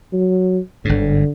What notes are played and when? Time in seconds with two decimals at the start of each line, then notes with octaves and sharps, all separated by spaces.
0.13 F#3
0.85 G1 G#2 D3